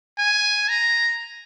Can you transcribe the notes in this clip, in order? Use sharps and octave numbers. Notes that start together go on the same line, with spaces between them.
G#5
A#5